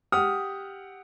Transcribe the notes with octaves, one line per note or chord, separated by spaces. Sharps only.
G4 F#5 D#6 F6